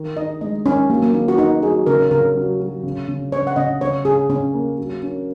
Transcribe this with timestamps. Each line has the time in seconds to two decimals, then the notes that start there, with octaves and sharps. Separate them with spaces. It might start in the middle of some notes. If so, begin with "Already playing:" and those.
Already playing: D#3
0.16 D#4 D#5
0.41 G#3 D#5
0.66 D#3 C#4
0.89 F#3 A#3
1.03 A#3
1.14 D#3 C#4
1.28 F#4
1.38 D#3 D#4
1.62 F#3 G#4
1.86 C#3 A#4
2.11 C#3 A#4
2.35 F#3
2.60 F#3
2.83 C#3
3.08 C#3
3.32 C#3 C#5
3.47 F#5
3.56 C#3 D#5
3.81 C#3 C#5
4.05 C#3 G#4
4.29 C#3 C#4
4.53 A#3
4.78 F#3
5.02 C#4